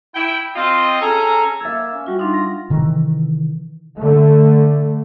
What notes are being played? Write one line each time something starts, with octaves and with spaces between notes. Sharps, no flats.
E4 G5
C4 F4 D#5
C#4 G#4 A4 G#5 A#5
A#3 E5 E6 G#6 A6
C#4
G3 F4 F#4
D4 D#4 F4
F#5 A#6
C3 D#3 E3
D3 A3